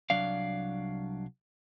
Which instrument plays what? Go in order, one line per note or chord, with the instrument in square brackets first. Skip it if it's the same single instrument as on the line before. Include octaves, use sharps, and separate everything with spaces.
[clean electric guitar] C2 C3 F#3 D4 D5 F5